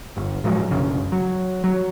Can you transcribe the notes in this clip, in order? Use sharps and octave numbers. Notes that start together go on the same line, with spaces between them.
G1
A2 F3 F#3 G#3
B1 F#2 C#3
F#3
F#3